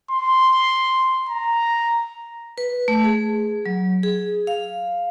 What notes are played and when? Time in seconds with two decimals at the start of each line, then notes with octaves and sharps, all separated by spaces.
0.11 C6
1.29 A#5
2.58 B4
2.88 A3
3.04 G#4
3.66 F#3
4.03 G#4
4.47 F5